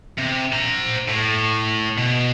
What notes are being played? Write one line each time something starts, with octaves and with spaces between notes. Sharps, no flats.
C3
C5 A#5
A2
B2